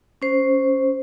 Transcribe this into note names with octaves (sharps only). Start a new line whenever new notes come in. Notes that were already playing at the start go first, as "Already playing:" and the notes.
C#4 C5